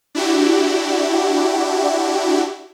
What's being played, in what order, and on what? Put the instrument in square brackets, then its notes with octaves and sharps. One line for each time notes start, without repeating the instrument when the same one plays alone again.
[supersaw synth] D4 E4 F#4 G4